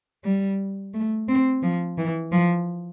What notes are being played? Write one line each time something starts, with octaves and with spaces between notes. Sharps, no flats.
G3
A3
C4
F3
E3
F3